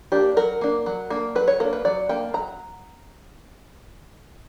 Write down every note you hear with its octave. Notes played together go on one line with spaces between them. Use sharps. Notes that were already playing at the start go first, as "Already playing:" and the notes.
A#3 D4 G4
F#3 A#4
A#3 D4
F#3
A#3 D4
F#3 B4
C#5
A#3 D4 A#4
B4
F#3 D5
A#3 D4 G5
F#3 A#5